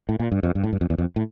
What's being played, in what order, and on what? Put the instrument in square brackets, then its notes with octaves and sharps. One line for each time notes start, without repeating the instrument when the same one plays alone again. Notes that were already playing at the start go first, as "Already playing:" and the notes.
[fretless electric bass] A2
A#2
G2
F2
G2
A2
G2
F2
E2
F2
A2